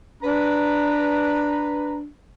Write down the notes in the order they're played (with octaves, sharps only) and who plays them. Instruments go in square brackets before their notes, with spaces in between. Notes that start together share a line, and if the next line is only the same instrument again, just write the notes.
[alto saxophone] D4 [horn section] B4 A#5